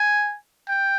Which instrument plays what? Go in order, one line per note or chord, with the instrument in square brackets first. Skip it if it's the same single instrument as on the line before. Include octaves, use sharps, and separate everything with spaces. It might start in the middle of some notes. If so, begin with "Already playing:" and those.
Already playing: [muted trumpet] G#5
G5